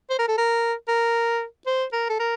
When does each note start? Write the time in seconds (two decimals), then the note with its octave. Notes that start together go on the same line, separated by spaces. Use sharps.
0.10 C5
0.19 A#4
0.28 A4
0.38 A#4
0.88 A#4
1.66 C5
1.93 A#4
2.09 A4
2.19 A#4